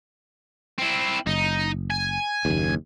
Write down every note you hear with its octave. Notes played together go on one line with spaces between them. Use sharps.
C4 E4
F#1 D#4
G#5
F#1 D#2